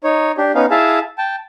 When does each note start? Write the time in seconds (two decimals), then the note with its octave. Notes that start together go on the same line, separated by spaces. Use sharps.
0.04 D#4 C#5
0.38 D4 G4
0.55 B3 C#4 D#4 F5
0.71 E4 G#4 E5 F5 A5
1.18 G5 A5